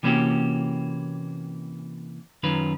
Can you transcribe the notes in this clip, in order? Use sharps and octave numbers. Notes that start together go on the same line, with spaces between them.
C3 E3 A#3 C#4 F#4 G4
F#2 D#3 C#4 F4 B4